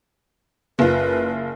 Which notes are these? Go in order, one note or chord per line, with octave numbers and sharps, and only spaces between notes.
F#1 F4 B4